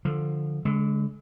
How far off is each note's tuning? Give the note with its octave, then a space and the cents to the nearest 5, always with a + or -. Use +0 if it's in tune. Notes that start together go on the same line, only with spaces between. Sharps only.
D3 +10 F3 +5
D3 -35 G#3 +10